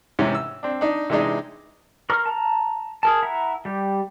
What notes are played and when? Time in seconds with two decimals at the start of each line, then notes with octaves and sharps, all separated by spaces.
0.19 G#2 C3 E3 C#4
0.35 E6
0.63 C4 D4
0.81 D4 D#4
1.10 C3 E3 G#3 D4 D#4
2.10 A#4 A#5 C6 C#6 F6
2.26 A5 A#5
3.03 G#4 A#4 A5
3.23 E4 E5 F#5 A#5
3.65 G3 G4